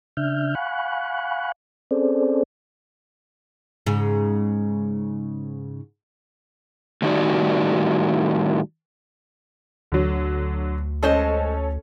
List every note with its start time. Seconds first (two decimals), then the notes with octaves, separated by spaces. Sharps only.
0.17 C#3 D4 E5 F6 G6
0.55 F5 F#5 G#5 B5 C#6 F#6
1.91 C4 C#4 G#4 A4 C5 D5
3.86 G#2 C#3
7.02 A2 D#3 G3 D#4 F#4 D5
9.92 D2 D3 F#3
11.03 G#3 C#4 A4 C5 D#5